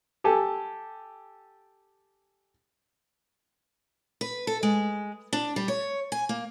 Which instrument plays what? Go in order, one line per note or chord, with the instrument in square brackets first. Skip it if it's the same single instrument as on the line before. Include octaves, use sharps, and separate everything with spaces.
[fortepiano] G4 A4 G#5
[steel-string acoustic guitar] B4
A4
G#3
D4
G3
C#5
G#5
A#3